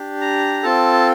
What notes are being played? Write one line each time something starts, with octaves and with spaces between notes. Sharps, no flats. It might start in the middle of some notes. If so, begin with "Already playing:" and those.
Already playing: D4 G4
A#5
C4 F4 A4 A5